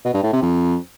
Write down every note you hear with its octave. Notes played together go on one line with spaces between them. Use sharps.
B2
G2
A2
C3
F2